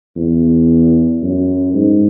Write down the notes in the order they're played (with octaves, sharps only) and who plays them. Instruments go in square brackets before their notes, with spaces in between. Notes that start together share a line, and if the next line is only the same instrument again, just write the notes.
[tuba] E2
F#2
G#2